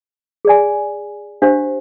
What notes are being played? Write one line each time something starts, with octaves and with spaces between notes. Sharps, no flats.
G#4 D5 G#5
D4 G4 C5 F5